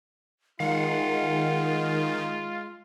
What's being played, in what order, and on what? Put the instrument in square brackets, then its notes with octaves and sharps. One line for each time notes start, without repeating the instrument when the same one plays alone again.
[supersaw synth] D#3 [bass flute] G#3 [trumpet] F4 [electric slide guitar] F5 F#5